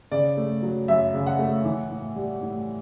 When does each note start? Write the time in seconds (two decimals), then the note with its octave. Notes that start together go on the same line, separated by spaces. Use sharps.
0.12 C#3 D5
0.37 A3
0.63 F#3
0.88 F#2 E5
1.14 C#3
1.26 F#5
1.39 A3
1.64 E3
1.90 A2
2.16 G3
2.41 A2